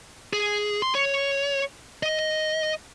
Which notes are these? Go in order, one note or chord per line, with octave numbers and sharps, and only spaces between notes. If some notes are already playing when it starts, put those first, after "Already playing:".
G#4
C6
C#5
D#5